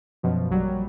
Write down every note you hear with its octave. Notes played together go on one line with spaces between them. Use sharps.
F#2 B2 F3
A#1 F#3 G3